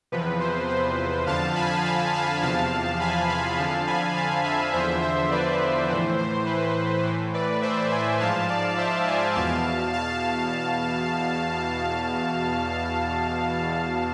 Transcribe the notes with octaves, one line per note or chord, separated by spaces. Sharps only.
E2 C3 F3 B4
C5
C5
F2 D3 F3 F5 A5
G#5 B5
F5 A5
F5 A5
E2 C3 F3 F5 A5
G#5 B5
F5 A5
F2 D3 F3 F5 A5
G#5 B5
F5 A5
E5 G#5
E2 D3 F3 C5 E5
C5 E5
B4 D5
A2 E3 C5
C5
B4
A2 E3
B4 D5
C5 E5
E5 G#5
G#2 F3 F5 A5
D5 F5
C5 E5
E5 G#5
E2 B2 F5 A5
F5 A5